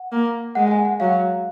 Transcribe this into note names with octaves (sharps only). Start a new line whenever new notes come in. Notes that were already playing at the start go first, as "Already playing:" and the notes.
Already playing: F#5
A#3
G#3 F#5
G#5
F#5
F#3 F5